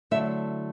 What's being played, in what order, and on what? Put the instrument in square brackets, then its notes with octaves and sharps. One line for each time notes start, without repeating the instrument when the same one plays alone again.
[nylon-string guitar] D3 F#3 A3 E4 E5